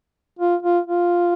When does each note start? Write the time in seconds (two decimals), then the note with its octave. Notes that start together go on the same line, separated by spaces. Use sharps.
0.39 F4
0.63 F4
0.87 F4